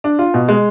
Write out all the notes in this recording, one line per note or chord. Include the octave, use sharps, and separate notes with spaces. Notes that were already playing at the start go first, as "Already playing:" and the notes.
D4
F4
B2
G#3